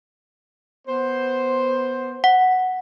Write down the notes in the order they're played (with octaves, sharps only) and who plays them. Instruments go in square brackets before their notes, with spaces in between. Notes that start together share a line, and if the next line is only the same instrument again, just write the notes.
[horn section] B3 C5
[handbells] F#5